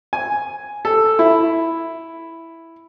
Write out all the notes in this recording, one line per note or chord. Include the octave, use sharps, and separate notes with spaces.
G#5
A4
E4